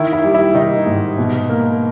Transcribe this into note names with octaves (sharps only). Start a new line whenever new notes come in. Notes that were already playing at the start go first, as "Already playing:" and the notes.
Already playing: D#3 E4
E4
G3
E4
D#3 D#4
G#2
B2
A#3